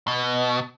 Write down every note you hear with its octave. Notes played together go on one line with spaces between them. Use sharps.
B2